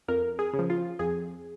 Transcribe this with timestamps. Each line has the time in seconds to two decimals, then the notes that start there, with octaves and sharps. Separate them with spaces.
0.08 F2 A#4
0.39 G#4
0.54 C#3
0.59 F3
0.70 F4
0.99 F2 G#4